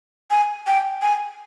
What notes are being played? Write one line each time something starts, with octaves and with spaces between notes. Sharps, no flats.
G#5
G5
G#5